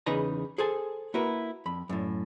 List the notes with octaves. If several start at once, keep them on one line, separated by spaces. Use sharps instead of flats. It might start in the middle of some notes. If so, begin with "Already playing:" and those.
E2 C#3 D#4 B4 G#5 A#5
G#4 A4 C5 G#5 A5
A#3 E4 F#4 A#4 B4
F2 B5
F#2 A2